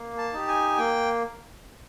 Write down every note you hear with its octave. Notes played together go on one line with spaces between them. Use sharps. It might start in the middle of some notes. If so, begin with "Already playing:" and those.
Already playing: A#3
A5
D#4 G4
G#5
A#3 G5